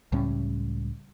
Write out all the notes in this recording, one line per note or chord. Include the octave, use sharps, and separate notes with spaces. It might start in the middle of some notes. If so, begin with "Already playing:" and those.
C#2 A2 G3 C#4